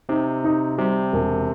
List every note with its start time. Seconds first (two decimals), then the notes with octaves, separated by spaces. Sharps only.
0.09 C3 D#4
0.44 D#4
0.78 C3 G3
1.13 E1